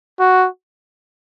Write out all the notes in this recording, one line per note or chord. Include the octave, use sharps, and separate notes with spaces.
F#4